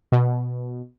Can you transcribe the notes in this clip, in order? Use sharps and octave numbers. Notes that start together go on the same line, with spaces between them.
B2